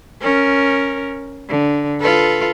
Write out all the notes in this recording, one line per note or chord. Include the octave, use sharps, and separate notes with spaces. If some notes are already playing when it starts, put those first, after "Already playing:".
C#4 A#4
D3
F4 A4 B4